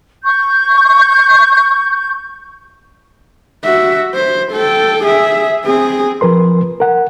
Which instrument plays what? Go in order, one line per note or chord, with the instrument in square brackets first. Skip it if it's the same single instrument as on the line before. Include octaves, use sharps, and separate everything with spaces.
[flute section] C#6 G6
[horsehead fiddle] F#4 E5
C5
A4 G5
G#4 E5
C4 G#4
[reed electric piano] F3 A#4 B4 C6
A#4 F#5